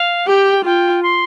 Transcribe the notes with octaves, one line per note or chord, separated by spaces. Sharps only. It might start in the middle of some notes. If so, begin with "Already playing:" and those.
Already playing: F5
G4 G5
F4 G5
C6